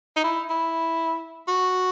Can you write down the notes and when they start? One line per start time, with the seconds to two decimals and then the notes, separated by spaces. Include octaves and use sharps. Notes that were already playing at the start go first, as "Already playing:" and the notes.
0.16 D#4
0.24 E4
0.50 E4
1.48 F#4